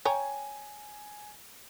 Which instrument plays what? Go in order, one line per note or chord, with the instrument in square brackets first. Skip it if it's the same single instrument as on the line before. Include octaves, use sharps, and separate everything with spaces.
[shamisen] C#5 G5 A#5 [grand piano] G#5